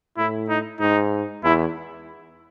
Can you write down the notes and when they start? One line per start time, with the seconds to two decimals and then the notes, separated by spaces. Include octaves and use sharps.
0.17 A2 E4
0.49 D#4
0.80 G#2 D#4
1.43 E2 E4